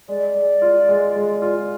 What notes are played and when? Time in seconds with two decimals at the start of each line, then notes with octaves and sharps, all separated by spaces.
0.08 G#3 D5
0.35 G#3
0.62 F4
0.89 G#3
1.15 G#3
1.42 F4